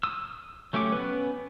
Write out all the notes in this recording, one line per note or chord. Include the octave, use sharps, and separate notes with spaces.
D#6 E6
F#3 A3 C#4 G4 D6
B3 C#4 B4